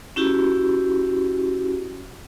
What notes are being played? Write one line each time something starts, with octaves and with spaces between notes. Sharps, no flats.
C#4 E4 F#4 G4